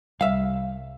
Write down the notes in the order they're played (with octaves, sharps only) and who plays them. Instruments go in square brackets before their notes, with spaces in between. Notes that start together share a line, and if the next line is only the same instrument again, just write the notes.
[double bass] C2 [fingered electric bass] G3 [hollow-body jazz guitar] E5 F5